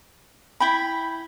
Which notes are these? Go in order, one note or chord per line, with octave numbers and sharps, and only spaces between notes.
E4 G5 B5